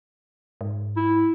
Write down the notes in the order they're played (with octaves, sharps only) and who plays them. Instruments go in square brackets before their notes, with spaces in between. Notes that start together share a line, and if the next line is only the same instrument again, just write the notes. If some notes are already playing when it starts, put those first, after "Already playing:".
[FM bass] G#2
[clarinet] E4